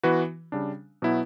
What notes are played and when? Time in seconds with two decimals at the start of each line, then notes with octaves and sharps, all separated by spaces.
0.03 E3 B3 F#4 B4
0.52 C#3 G3 D4
1.02 B2 F#3 B3 E4